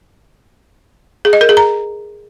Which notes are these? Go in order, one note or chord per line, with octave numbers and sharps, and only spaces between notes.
G#4
D#5
A#4
G#4
A#5